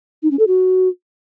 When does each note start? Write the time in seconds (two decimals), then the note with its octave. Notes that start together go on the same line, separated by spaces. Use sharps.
0.23 D#4
0.31 C#4
0.39 A4
0.47 F#4